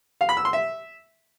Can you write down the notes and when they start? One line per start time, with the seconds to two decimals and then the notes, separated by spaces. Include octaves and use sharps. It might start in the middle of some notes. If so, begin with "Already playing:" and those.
0.21 F5
0.29 B5
0.37 E6
0.45 C6
0.53 E5